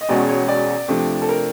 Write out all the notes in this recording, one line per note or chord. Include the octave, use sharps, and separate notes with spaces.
D#5
E1 E2 B2 G#3 C#4 D5
C#5
D5
F2 C3 F3 A3 D4
A4
A#4